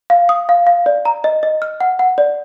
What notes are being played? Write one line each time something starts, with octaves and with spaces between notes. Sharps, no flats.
F5
D#6
F5
F5
D5
A#5
D#5
D#5
F6
F#5
F#5
D5